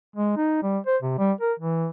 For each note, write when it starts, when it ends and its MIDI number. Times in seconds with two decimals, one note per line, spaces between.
0.16 0.34 56
0.37 0.60 63
0.63 0.78 55
0.87 0.97 72
1.02 1.15 48
1.19 1.32 55
1.41 1.53 70
1.59 1.89 52